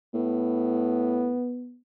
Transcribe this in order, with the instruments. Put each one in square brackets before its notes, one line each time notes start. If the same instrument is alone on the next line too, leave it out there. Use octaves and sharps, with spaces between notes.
[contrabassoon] A2 [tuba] B3